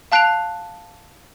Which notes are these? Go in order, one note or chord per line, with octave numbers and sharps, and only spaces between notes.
F5 A5 F#6 C7 D7 F7